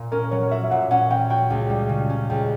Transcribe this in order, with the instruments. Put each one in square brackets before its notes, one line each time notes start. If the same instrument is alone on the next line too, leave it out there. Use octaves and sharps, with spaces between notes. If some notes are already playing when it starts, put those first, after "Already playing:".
Already playing: [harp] A#2
[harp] C#4 [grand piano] A#4
[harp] F#3 [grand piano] C#5
[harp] F#4 [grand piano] E5
[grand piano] E5
[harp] A#2 [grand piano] F#5
[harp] C#4 [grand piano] F#5
[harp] F#3 [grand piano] G5
[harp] F#4 [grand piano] G5
[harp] C#2
G3
C#3
C#4
[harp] C#2 [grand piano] G5